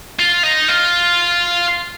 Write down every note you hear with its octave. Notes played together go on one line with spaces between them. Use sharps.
F4
D#4
F4